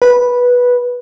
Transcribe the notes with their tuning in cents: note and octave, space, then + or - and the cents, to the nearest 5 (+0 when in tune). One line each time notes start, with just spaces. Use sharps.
B4 -10